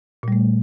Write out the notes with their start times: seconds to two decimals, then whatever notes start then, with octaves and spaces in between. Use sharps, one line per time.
0.23 A#2
0.28 G3
0.32 A3